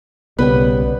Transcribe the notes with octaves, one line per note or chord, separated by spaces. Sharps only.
B1 C#3 G3 B3 B4 G5